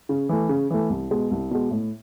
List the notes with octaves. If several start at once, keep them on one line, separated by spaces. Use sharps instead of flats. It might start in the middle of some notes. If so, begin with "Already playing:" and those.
C#3
E3 A3
C#3
E3 A3
C2
B2 G#3
C2
B2 G#3
A2